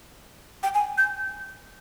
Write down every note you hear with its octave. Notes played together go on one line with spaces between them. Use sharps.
G5
G#5
G6